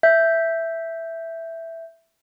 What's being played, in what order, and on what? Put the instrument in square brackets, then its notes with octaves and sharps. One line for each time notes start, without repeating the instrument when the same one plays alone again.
[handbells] E5 G6